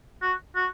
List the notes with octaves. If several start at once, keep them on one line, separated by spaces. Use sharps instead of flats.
F#4
F#4